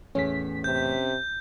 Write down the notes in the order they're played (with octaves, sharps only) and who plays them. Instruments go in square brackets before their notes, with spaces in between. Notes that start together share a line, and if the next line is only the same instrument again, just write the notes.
[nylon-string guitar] E2 A2 [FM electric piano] C#4 B6
[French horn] C3 [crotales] G6